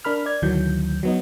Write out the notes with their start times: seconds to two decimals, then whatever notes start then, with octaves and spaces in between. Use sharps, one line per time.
0.04 D4 A#4 B5 F6
0.26 D5 G#6
0.42 D2 D#3 E3 F#3 G6
1.03 F#3 B3 D#4